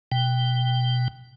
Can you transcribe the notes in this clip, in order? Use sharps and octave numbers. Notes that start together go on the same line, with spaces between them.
B2 G5